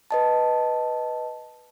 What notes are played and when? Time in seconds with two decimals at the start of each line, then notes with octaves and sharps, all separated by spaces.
0.11 B4 D#5 A5